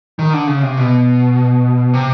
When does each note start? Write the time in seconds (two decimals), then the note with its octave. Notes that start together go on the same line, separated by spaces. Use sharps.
0.19 D#3
0.33 D3
0.47 C#3
0.63 C3
0.78 B2
1.94 C3